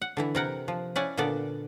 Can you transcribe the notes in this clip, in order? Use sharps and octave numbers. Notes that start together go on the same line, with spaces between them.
F#5
D3 E3 E4
C3 A#4 F#5 G5
F3
C#4 E4 D5 F#5 G#5
A#2 D3 B3 A4 D5